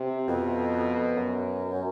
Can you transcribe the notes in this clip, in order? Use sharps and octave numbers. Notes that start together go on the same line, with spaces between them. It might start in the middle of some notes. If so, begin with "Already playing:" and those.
Already playing: C3
F2 B2
F#2